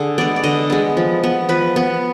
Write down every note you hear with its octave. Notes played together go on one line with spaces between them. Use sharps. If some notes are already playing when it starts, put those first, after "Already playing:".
Already playing: D3 G#4
G#3 B3 D5
D5
D3 D#5
G#3 B3
F3
B3
F3 B4
B3